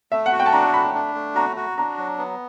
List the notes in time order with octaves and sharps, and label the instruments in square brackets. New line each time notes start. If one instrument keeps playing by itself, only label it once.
[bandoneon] A3 [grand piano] E5
[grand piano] F#5
[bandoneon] F#4
[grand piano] G5
A5
[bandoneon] D4 [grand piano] A#5
[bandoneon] A3 [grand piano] B5
[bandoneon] D4
A3
[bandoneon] F#4 [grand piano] A#5
[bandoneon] F#4
[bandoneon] D4 [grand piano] A#5
[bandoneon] F#3
B3